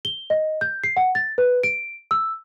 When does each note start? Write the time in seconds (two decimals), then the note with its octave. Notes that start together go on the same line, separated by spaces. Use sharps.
0.05 G7
0.30 D#5
0.61 G6
0.84 C7
0.97 F#5
1.15 A6
1.38 B4
1.63 D7
2.11 E6